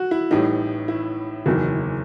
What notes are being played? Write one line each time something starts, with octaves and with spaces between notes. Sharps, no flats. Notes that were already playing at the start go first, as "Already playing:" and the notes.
Already playing: F#4
E4
A1 A2 E3 G3 D#4
E4
F#1 E2 D#3 F#3